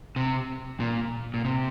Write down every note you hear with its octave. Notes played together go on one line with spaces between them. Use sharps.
C3
A#2
A#2
C3